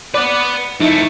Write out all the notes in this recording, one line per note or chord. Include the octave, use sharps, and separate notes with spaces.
B4 D5 F#5
F2 A3 D#4 E4 E5